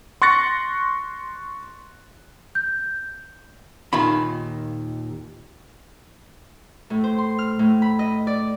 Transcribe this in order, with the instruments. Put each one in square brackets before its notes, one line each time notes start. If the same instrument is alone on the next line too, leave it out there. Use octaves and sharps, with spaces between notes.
[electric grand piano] C6 C#6 F#6 A6 A#6 C#7
[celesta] G6
[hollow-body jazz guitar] D#2 A#2 D#3 F4 B5
[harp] A2
C5
C6
F6
A2
B5
D#5
D5